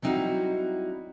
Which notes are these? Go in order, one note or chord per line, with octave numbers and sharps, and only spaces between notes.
F#3 G3 C4 D#4 E4 F#4